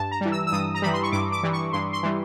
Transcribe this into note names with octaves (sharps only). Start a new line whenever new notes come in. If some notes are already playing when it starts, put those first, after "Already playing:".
Already playing: G2 A5
A#5
E3 G3
E6
E6
G2 D#6
A#5
E3 G3 B5
C6
C#6
G2 D6
D6
E3 G3
C#6
G2 C6
C6
E3 G3